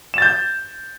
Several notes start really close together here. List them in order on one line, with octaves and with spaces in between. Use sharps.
E7 A6 G6